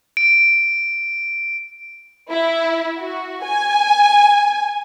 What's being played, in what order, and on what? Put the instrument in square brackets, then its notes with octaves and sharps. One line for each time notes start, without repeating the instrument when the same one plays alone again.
[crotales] D7
[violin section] E4
F#4
G#5